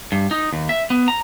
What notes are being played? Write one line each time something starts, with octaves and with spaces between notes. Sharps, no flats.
G2
D#4
D#2
E5
B3
A#5